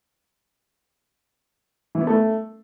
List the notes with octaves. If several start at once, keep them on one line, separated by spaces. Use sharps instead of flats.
E3
B3
A3